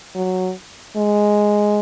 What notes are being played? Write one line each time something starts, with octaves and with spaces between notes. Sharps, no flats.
F#3
G#3